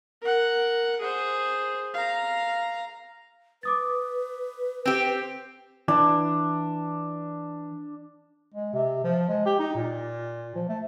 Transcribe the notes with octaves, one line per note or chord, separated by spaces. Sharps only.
A#4 F#5
G#4 C5
F5 A#5
B4 D6 D#6 A6
C4 G4
E3 D4
G#3
C3
F3
G#3
G4
D#4
A#2
F3
A3